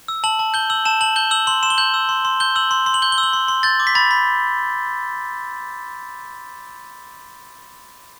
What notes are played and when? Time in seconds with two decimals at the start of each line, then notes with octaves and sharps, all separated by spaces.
0.08 E6
0.24 A5 F#7
0.39 A5
0.54 G6 G7
0.70 E6 F#7
0.85 A5 E7
1.01 A5 F#7
1.16 G6 G7
1.31 E6 F#7
1.47 C6 F#7
1.63 C6 E7
1.70 G7
1.78 G6 F#7
1.94 E6
2.09 C6
2.25 C6
2.40 G6 G7
2.56 E6 F#7
2.71 C6
2.86 C6
2.94 F#7
3.02 G6 G7
3.12 G7
3.18 E6
3.23 F#7
3.33 C6
3.48 C6
3.63 G6 A6
3.80 D6
3.87 B6
3.95 B5 A6
4.11 B5